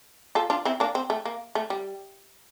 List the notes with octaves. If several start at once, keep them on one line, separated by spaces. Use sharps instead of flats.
F4 A4
D4 F4
C4 E4
A#3 D4
C4
A3
A#3
A3
G3